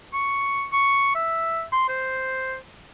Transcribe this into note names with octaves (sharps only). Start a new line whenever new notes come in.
C#6
C#6
E5
C6
C5